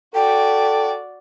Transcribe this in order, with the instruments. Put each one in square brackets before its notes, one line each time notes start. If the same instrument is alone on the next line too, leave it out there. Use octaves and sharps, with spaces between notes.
[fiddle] F#4 D5 [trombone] A4 [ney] G5